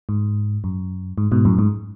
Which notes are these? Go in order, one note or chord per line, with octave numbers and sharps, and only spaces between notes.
G#2
F#2
G#2
G#2 B2
F#2 A2
G#2